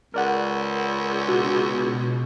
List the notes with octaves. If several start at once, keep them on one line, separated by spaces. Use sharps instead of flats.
C#2 A#4 D5 F#5
B2 D4 F#4